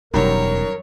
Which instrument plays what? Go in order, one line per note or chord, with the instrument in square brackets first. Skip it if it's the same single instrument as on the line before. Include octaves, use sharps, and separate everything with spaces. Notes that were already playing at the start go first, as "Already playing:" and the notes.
[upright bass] E1 [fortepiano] F#2 D#3 G3 [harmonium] A#4 [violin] C#5